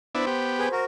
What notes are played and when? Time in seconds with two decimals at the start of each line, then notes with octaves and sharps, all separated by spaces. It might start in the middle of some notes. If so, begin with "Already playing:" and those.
0.15 B3 D4 E4 C5
0.26 B3 G4
0.59 G#4 B4
0.72 F#4 A#4